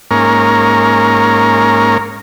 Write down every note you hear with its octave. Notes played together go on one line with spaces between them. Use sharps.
G#2 A#3 C#4 A#4